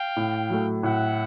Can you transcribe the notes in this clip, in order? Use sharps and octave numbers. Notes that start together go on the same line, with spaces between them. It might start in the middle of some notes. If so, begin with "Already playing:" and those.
Already playing: F5 G5
A2
F#3 A3
A2 E5 F#5